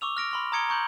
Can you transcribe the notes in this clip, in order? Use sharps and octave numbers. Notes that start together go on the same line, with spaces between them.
C#6 D6 E6 F7
F6 A#6 D7
B5 C6 F6
A#5 D#6 G#6 C#7 D7 G7
A#5 C#6 G6 F#7